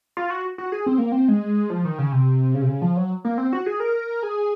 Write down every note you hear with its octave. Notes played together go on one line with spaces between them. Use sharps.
F4
F#4
F#4
G#4
C4
A#3
C4
G#3
F3
D#3
C#3
C3
C#3
C3
C#3
F3
F#3
A#3
C4
F#4
G#4
A#4
G#4